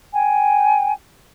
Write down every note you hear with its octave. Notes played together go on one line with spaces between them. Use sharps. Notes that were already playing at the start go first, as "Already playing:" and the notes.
G5 G#5